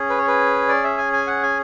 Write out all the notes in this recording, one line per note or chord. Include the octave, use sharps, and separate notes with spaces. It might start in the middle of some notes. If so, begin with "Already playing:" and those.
Already playing: C#4 G#4
B4
C#5
B4
D5
E5
G#5
G#5
F#5
G#5